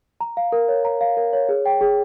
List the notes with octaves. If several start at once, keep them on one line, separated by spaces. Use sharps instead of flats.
A#5
F5
A#4
C#5
A#5
F5
A#4
C#5
G#4
G5
G#4